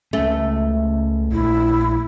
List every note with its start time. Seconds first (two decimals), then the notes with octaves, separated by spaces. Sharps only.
0.13 C#2 A3 C#4
1.32 A#1 E4